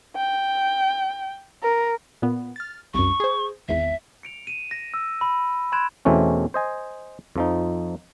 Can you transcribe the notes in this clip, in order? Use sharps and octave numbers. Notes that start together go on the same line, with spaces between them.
G5
A#4
A#2 B3
F6 A6
C2 F#2 C#6
G#4 C5
G#1 E2 E5
C#7 D7 F7
D#7 E7
A#6
E6
B5
B5 C6 F#6 G#6 D7 E7
E2 B2 E3 A3 C4 C#4
C5 D#5 G#5
F2 F3 D#4